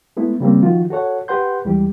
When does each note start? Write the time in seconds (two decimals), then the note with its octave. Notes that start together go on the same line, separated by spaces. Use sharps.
0.17 G#3 A3 B3 E4
0.40 C#3 G3 A#3 C4
0.62 D#3 F3 F4 F#4
0.90 F#4 A4 C#5 F#5
1.28 G4 B4 F#5 C6 G6
1.65 D#2 E3 G3 G#3 G4